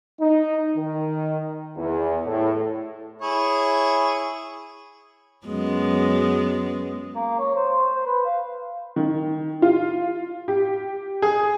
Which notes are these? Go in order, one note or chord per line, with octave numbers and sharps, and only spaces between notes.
D#4
D#3
E2
A2
E4 G#4 C#5
F#2 G#3 B3
A#3
C#5
C5
C5
B4
F5
D#3
F4
G4
G#4